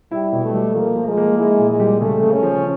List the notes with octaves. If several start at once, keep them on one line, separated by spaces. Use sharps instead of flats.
G3 E4
B2
A3
G3
F3 A#3
F3
G#3
A#3
G#3 E4
A#2
G#3
G3
C#3 A3
C#3
C#4
F3